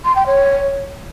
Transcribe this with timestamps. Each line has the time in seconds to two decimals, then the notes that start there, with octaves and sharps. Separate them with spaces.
0.05 C6
0.16 G5
0.26 C#5